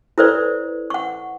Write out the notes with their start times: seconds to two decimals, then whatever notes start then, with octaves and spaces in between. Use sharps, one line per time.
0.18 E4 A4 B4 C5 D5
0.90 F#5 C#6